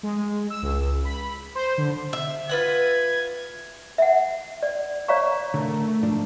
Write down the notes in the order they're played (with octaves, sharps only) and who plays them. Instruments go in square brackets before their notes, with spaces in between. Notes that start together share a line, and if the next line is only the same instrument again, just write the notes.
[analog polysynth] G#3
E6
C#2
B5
C5
D3
[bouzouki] E5
[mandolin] F4 B4 F#5 [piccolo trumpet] G#6
[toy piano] E5 F#5
D5
C#5 D5 F5 A#5 C#6
[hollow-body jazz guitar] D3 A#4 [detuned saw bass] A3
[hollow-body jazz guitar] G#2 F3 D4